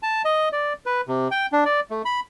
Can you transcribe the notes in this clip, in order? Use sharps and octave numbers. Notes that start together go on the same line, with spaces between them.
A5
D#5
D5
B4
C3
G5
D4
D5
A3
B5